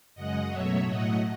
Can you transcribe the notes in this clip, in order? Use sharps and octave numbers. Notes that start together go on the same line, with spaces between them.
F#2 C#3 G#3 D#5 F#5
B2 F#3 A3 C#5 E5
A2 F#3 A3 D#5 F#5